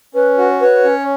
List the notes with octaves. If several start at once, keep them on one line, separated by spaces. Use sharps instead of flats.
C#4 B4
F#4
B4 C#5
C#4